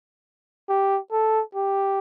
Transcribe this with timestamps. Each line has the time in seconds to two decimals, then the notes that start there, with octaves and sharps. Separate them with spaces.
0.69 G4
1.12 A4
1.55 G4